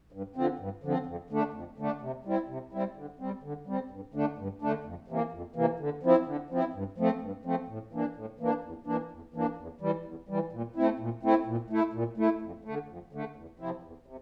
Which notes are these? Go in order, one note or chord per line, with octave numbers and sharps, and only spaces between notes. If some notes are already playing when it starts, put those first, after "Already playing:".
G2
D3 F3 C4
G2
D3 F3 C4
F2
D3 A3 D4
F2
D3 A3 D4
C3
G3 C4 E4
C3
G3 C4 E4
D3
G3 C4
D3
G3 C4
G2
D3 A3 D4
G2
D3 A3 D4
F2
C3 E3 A#3
F2
C3 E3 A#3
D3
F3 C4 E4
D3
F3 C4 E4
G2
F3 A3 C4
G2
F3 A3 C4
A2
E3 A#3 D4
A2
E3 A#3 D4
E2
E3 A#3 D4
E2
E3 A#3 D4
E2
E3 G3
E2
E3 G3
A#2
A3 C4 E4
A#2
A3 C4 E4
A#2
A3 E4
A#2
A3 E4
F2
D3 A3
F2
D3 A3
E2
C3 F3 C4 E4
E2
C3